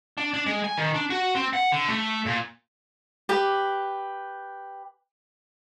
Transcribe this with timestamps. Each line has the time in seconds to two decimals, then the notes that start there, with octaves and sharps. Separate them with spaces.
0.17 D4
0.34 D4
0.46 G#3
0.64 G#5
0.77 D#3
0.94 D4
1.10 F#4
1.35 C4
1.53 F#5
1.72 D3
1.88 A3
2.26 A#2
3.29 G4 B4